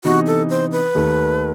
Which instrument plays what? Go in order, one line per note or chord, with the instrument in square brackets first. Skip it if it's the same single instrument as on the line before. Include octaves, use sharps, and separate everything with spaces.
[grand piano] C3 E3 B3 D#4 [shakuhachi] F#4
[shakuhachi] A4
C5
B4
[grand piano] D#2 D#3 A3